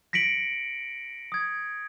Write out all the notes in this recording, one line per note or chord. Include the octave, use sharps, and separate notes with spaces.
A#6 B6 C#7 D7 F#7
D#6 G#6